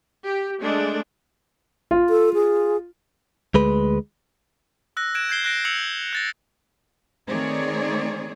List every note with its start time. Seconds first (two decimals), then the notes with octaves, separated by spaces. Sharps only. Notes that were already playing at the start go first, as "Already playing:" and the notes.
0.24 G4
0.61 G#3 A3 D4
1.91 F4
2.10 A4
2.34 G#4
3.54 D2 G#3 B4
4.97 E6 F#6 A#6
5.14 F#6 G#6 D7 E7
5.29 G6 G#6 C7 G7
5.44 F#6 A#6 D7
5.65 E6 C#7 F7 F#7
6.13 F#6 A6 A#6
7.28 D#3 A3 C4 G#4 C#5 D5